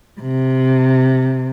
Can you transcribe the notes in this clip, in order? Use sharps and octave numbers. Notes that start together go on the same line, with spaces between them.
C3